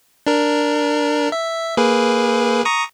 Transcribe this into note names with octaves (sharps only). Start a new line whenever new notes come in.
D4 A#4
E5
A#3 G#4 B4
A#5 C#6 D#6